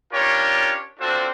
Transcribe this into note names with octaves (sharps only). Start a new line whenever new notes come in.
C#4 D4 F4 G4 A#4 C#5
C4 D4 F4 F#4 A4 C5